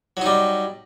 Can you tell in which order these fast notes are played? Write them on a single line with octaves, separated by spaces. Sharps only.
F#3 D#4 G3